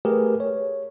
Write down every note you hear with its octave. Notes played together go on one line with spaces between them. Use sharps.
A3 G4 G#4 A#4 B4
C#5